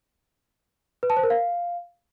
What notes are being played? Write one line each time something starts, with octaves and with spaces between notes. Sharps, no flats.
B4
A5
C5
A#4
F5